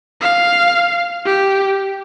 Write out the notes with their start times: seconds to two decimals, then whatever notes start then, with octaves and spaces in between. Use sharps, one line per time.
0.21 F5
1.26 G4